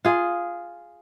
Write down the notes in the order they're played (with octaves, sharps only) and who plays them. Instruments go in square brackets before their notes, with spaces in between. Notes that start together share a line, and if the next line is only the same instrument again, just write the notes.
[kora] F4 G#4